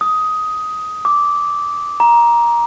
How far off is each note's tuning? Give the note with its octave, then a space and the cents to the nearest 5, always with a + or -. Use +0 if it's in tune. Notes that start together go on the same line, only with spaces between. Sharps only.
D#6 +10
D6 -10
A#5 +15